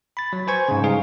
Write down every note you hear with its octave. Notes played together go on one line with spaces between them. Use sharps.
B5 A6
F#3
B4 C5 G#5 C#6 G#6
G#2 C#3
G#2 G3 G#4 F5